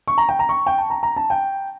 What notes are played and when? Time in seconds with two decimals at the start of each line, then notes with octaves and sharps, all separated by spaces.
0.08 C#6
0.18 A#5
0.29 G5
0.39 A#5
0.49 C#6
0.66 G5
0.78 A5
0.90 A#5
1.03 A#5
1.17 A5
1.30 G5